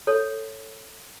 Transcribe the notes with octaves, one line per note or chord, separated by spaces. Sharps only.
A4 C#5